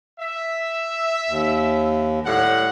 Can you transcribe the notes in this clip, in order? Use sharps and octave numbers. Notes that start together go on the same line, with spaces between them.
E5
D#2
A2 G3 F#5